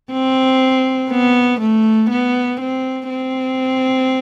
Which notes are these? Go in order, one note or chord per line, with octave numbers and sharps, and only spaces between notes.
C4
B3
A3
B3
C4
C4